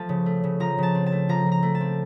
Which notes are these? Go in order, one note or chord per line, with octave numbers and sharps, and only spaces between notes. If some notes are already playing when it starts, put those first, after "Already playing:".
Already playing: F3 A3 A5
C#3
A3
C#3
F3 A#5
C#3 A5
C4
A5
A3
F3 A#5
F3
A#5
A3
A5
C4